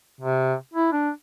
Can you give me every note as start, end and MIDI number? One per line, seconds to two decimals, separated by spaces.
0.21 0.54 48
0.74 0.91 64
0.92 1.10 62